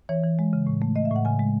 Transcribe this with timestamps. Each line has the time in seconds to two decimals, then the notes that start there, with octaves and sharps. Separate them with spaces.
0.09 E3 C#5
0.24 E3
0.39 G#3
0.53 C#3
0.67 A2
0.82 A3
0.96 A3 D#5
1.05 E5
1.11 A2
1.16 F#5
1.25 C#3 G#5
1.39 G#3